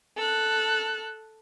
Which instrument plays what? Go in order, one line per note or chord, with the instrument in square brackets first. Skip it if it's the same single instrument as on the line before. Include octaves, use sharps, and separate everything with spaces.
[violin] A4 F#6